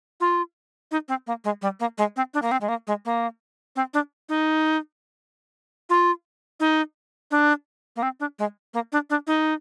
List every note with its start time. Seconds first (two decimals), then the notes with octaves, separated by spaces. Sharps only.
0.20 F4
0.91 D#4
1.08 C4
1.27 A#3
1.44 G#3
1.62 G3
1.80 A#3
1.98 G#3
2.16 C4
2.34 D4
2.42 A#3
2.51 C4
2.61 G#3
2.68 A#3
2.87 G#3
3.05 A#3
3.76 C4
3.94 D4
4.29 D#4
5.89 F4
6.60 D#4
7.31 D4
7.96 A#3
8.03 C4
8.20 D4
8.39 G#3
8.74 A#3
8.92 D4
9.10 D4
9.27 D#4